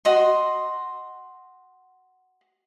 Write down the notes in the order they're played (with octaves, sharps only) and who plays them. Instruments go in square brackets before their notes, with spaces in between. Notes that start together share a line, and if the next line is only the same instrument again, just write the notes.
[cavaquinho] F#4 D#5 C6